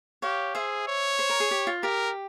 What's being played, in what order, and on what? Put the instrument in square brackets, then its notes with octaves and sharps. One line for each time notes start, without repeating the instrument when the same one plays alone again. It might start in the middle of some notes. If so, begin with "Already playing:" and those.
[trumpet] G4 [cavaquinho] C#5 F5
[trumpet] G#4 [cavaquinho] C5 E5
[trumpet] C#5
[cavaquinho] C5
A#4
G#4
G4
F4
[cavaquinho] G4 [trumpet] A#4